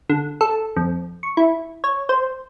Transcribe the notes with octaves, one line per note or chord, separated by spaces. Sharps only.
D3
A4
F2
C#6
E4
C#5
C5